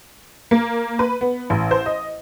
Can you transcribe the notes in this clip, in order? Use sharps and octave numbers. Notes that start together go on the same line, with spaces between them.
A#3
B4
B3
A1
C5
D#5